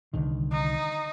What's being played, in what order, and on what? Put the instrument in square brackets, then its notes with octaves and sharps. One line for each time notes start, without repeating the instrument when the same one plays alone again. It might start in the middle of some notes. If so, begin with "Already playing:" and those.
[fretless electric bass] C2 D3 D#3
[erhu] D#4